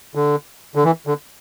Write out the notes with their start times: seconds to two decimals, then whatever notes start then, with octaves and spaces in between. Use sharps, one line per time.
0.15 D3
0.75 D3
0.84 E3
1.07 D3